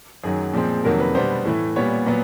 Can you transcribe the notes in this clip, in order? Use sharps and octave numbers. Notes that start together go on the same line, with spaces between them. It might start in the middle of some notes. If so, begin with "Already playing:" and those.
F#2 D#3 F#3 G#4
A#2 F3 G#3 C4
F2 C3 D#3 F#3 A#3 A#4
B4
B2 G3 B3 D4 C5
A2 E3 A3
A#2 G3 B3 C#5
A#2 F#3 B3